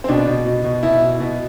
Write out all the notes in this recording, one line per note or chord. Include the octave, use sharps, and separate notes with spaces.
C4
B2 D4
B2
B2
B2
B2 E4
B2
B2